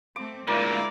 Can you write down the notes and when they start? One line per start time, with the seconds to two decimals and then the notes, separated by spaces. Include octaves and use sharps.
0.16 A3 C4 D6
0.47 D2 A#2 G#3 E4 A#4 D5 F5